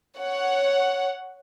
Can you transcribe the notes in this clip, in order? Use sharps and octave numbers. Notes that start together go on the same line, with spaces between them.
C#5 F#5